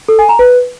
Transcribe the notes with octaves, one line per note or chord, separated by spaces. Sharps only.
A4
G#5
A#5
B4